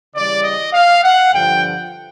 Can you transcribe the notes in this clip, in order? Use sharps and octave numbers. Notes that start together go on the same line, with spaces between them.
C#3 E3 G3 D5
D#5
F5
F#5
G2 D3 F3 G5